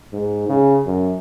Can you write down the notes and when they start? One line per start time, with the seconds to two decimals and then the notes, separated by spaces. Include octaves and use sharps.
0.13 G#2
0.49 C#3
0.86 F#2